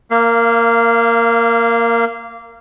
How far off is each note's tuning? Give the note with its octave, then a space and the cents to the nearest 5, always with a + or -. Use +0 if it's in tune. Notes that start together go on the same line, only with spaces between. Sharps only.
A#3 -5 F5 -30